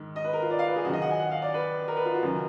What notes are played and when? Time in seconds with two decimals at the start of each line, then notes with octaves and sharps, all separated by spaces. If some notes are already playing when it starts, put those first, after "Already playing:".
Already playing: G#2 D#3
0.16 D#5
0.24 B4
0.33 A#4
0.42 F4
0.50 D5
0.59 F5
0.67 B4
0.76 G#4
0.85 F#2 F#4
0.89 D#3 D#5
1.02 F#5
1.11 G#5
1.20 F#5
1.31 F5
1.42 D5
1.54 B4
1.88 A#4
1.97 B4
2.05 F4
2.14 F#4
2.22 F#2 D#3 A#4